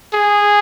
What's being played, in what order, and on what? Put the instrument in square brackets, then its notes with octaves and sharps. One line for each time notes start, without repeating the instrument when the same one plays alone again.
[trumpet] G#4